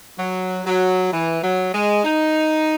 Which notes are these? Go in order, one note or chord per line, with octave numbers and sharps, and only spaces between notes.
F#3
F#3
E3
F#3
G#3
D#4